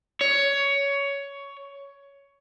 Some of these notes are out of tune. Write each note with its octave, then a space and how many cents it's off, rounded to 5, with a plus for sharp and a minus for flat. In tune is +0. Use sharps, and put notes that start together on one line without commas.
C#5 +15